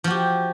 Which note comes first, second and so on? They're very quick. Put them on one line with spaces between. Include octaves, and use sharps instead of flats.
F3 F#4 G4